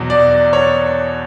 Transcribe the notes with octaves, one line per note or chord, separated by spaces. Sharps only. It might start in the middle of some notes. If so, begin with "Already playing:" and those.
Already playing: E2 B2 F#3
D5
C#5